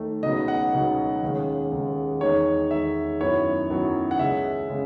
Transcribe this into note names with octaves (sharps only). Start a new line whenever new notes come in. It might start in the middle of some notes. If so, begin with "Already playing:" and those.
Already playing: D#2 D#3 A3
C#2 B2 F#3 B3 D#4 D#5
F#5
C#2 B2 F#3 B3 D#4
D#2 C#3 G#3
D#2 C#3 G#3
E2 D#3 G#3 D#4 C#5
E2 D#3 G#3 D#4 E5
F#2 D#3 F#3 B3 E4 C#5
F#2 D#3 F#3 B3 E4
F#5
C#2 C#3 G#3 E5
C#3 G#3